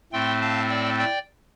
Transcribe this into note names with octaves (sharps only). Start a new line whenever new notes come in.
A2 A3 C4 G5 C6
F5 A5
D5 G5
D5 G5